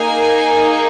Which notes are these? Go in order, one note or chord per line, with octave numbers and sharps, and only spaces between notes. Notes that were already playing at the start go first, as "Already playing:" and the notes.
Already playing: A#3 D#4 G#4 G#5